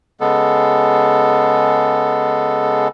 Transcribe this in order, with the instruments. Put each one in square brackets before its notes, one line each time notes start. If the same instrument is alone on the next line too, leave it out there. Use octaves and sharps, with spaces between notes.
[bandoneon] C#3 G#3 B3 A4